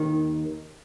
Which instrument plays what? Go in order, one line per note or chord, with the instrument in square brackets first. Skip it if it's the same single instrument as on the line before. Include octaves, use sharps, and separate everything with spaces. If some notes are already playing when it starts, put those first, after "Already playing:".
Already playing: [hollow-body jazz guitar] D#2 D#3